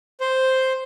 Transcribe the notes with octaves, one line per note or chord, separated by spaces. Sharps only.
C5